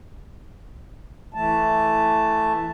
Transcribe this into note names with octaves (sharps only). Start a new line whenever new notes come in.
E3 A3 A5